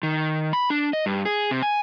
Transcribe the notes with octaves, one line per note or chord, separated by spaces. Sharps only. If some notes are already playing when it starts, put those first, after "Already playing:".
D#3
B5
D4
D#5
G2
G#4
C3
G#5